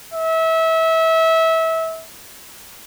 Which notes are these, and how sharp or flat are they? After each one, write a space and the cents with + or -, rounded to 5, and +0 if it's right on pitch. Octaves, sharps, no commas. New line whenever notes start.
E5 -25